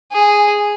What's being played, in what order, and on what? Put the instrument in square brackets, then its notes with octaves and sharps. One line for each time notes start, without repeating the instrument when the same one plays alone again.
[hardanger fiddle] G#4